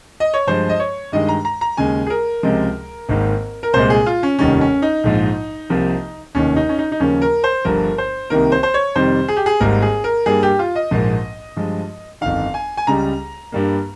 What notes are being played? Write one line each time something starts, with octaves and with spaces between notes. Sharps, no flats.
D#5
C#5
G2 F3 G#3 C5
D#5
C#5
G2 D#3 G#3 D#5
A#5
A#5
A#5
D#2 C#3 G#3 G#5
G#4
A#4
C#2 C3 F3 G#3
G#1 G#2 D#3 A#3
A#4
C2 A#2 G#3 C5
G#4
F4
C#4
F1 D#2 D#3 G3 C#4
C#4
D#4
A#1 G#2 F3
C2 C3 F3 A#3
F1 D#2 D#3 C#4
D#4
C#4
D#4
D#4
D#2 C#3 F3 A#3 C#4
A#4
C5
G1 G2 F3 A#4
C5
C2 C3 D#3 A#3 A#4
C5
C5
C#5
F2 C3 D#3 G3 C5
G#4
G4
G#4
G#1 G#2 G3 A#3 A#4
G#4
A#4
G2 G3 A#3 G#4
G4
F4
D#5
A#1 G#2 F3 A#3
G2 F3 G#3
G1 F2 D#3 F5
G#5
G#5
C#2 C#3 G3 A#5
G2 G3 A#3